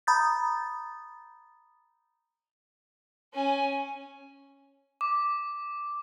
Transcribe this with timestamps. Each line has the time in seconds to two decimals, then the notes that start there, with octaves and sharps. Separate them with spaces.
0.07 A#5 B5 D#6 G6 A6
3.34 C#4 G#5
5.01 D6